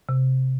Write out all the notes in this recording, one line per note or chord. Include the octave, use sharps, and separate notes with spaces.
C3